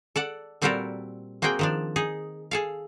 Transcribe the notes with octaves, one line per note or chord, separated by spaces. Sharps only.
A4 D5 F#5
A#2 G3 C4 F#4 A4 A#4
A#3 C4 F#4 G#4 G5
D#3 F3 D4
D#4 G#4
G#4 A4 F5